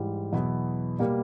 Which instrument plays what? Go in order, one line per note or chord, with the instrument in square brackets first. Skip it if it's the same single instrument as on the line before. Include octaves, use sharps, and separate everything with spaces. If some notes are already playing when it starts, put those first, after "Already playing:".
Already playing: [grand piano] G#2 E3 G3
E2 B2 F#3 B3 E4
B2 G3 A#3